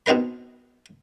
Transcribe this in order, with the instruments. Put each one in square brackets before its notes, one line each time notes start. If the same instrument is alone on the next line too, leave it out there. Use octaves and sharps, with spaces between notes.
[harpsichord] B2 C4 D#4 A#4 B5